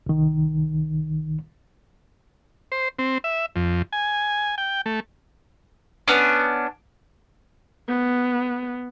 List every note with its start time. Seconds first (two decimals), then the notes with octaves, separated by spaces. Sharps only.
0.06 C2 D#3
2.72 C5
2.99 C4
3.24 E5
3.56 F2
3.93 G#5
4.58 G5
4.86 A3
6.08 B3 C#4 D4
7.88 B3